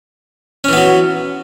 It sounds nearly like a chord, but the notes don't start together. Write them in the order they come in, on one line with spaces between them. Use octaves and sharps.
C#4 E3 B3 F#3